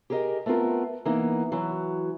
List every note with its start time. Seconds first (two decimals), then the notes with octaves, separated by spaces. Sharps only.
0.10 G4 G#4 A#4 D#5
0.46 A3 B3 C4 F4 A#4
1.05 E3 A#3 B3 D#4
1.52 E3 F#3